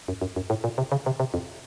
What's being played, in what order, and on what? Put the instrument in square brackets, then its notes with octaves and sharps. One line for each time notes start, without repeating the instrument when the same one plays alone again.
[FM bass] F#2
F#2
F#2
A2
A#2
C3
C#3
C3
C3
F2